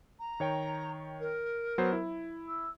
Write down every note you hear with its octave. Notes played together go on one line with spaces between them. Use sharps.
A#5
D#3 C#5 G5
A#4
F#3 B3 C5
E4
E6